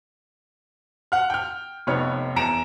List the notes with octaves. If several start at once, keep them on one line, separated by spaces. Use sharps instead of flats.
F#5 F6
G5 F6
F1 F2 B3 D#4 C#5 F6
E2 A#5 D7 E7